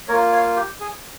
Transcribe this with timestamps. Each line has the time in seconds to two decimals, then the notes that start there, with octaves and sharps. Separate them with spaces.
0.08 A#3 F4 A#4 C#5
0.32 C#5 F5
0.56 G4
0.80 G#4